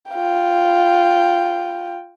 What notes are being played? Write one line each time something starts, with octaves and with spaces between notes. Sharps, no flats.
F4 G5